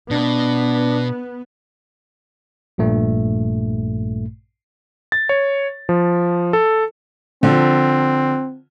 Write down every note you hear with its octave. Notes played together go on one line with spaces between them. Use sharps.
B2 B3 D4
A#1 G2 A#2 A3
A6
C#5
F3
A4
D3 F3 C4